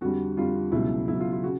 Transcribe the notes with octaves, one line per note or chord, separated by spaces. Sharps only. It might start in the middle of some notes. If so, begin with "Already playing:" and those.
F2 D3 G3 F#4
F2 D3 G3 F4
C#2 B2 F#3 E4
C#2 B2 F#3 E4
F4
F4
C#3 F#4